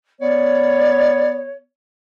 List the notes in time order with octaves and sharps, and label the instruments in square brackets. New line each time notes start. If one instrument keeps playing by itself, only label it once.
[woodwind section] B3 C#5 [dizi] D5